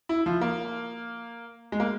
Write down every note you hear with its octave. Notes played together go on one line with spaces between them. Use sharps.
E4
F3
A#3
G#3
A#3